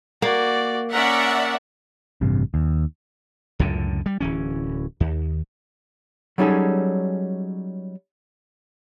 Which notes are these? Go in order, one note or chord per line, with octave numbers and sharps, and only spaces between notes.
A#3 F#4 D5
C#4 A#4 D5 E5 F#5
A1 G2 C3
D#2
C#2 F#2 A2 D3
G3
D1 E3 C#4
D#2
F#3 G3 C#4 D#4 G#4 A4